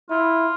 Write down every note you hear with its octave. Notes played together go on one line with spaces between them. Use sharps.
E4 F4